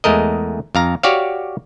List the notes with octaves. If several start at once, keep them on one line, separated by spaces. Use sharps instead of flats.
E2 G#3 A3 A#4 D#5
F2 F5 A#5
F#4 G4 C#5 D5 F5